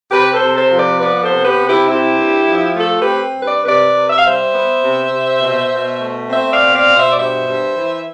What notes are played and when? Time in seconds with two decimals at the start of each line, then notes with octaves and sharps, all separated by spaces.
0.11 C3 G4 B4
0.34 A4 C5
0.41 C3
0.56 A4 C5
0.70 F3
0.78 B4 D5
1.00 B3 B4 D5
1.22 A4 C5
1.29 C3
1.43 G4 B4
1.59 C3
1.66 E4 G4
1.88 C4 E4 G4
2.18 G2
2.48 F3
2.76 A3 F4 A4
2.98 G4 B4
3.06 C4
3.35 G2
3.42 B4 D5
3.65 C3 B4 D5
3.94 C3
4.10 E5
4.17 F5
4.23 G3 C5 E5
4.54 B3
4.83 C3
5.12 C3
5.42 B2
5.72 B2
6.01 A3
6.29 C4 C5 E5
6.51 D5 F5
6.59 B2
6.74 D5 F5
6.89 B2
6.96 C5 E5
7.10 D5
7.18 G2 C5 E5
7.48 G2
7.77 E3